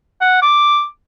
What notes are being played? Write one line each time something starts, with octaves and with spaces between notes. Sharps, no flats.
F#5
D6